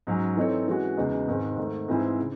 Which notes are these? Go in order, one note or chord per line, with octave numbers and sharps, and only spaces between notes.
G#2 F#3 C#4
E3 C4 D#4 A4 C#5
E3 G#3 C#4 F#4
E2 C#3 G#3 D#4
G#2 D#3 G#3 C4
G#2 D#3 A3 D#4
G#2 E3 C4 E4 G#4
C#3